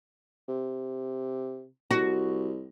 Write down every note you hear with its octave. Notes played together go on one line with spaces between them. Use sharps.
C3
C2 F#4